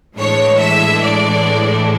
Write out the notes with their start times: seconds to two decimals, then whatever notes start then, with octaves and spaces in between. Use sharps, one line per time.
0.17 A2 E3 G#3 D4 C#5
0.59 E5
1.00 D5